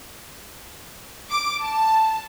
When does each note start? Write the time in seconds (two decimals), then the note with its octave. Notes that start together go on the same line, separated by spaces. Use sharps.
1.30 D6
1.62 A5